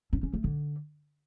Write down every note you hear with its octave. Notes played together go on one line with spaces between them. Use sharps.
C#4
C#4
A3
D3